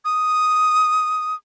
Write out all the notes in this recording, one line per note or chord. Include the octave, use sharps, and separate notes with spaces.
D#6